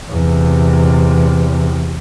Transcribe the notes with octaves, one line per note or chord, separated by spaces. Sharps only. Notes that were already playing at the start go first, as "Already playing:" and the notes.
E2 C3